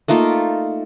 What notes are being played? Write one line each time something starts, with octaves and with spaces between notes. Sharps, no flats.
A3 A#3 D#4 F4